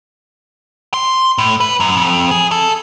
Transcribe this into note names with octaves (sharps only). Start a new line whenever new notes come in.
C6
A2
B4
F#2
F2
G#4
A4